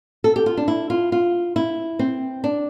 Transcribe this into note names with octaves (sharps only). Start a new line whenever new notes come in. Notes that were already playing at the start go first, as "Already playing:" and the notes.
A4
G4
F4
D4
E4
F4
F4
E4
C4
D4